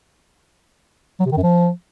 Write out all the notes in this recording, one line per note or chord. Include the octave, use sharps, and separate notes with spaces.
F#3
C3
D#3
F#2
F3